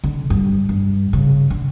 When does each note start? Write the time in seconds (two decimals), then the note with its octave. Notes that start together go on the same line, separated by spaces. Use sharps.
0.04 D3
0.30 G2
0.69 G2
1.13 C#3
1.50 D3